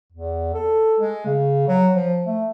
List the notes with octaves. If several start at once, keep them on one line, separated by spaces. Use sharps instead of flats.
E2
A4
G#3
C#3
F#3
F3
A3